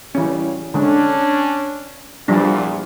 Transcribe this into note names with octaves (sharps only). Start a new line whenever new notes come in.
F#2 C#3 E3 G3 C#4
D3 G#3 C#4 D4
E2 A#2 F3 G3 D4